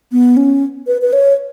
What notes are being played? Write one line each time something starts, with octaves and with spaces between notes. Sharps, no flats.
B3
C#4
B4
B4
C#5